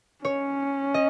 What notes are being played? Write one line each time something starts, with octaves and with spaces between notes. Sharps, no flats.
C#4 C#5
D#5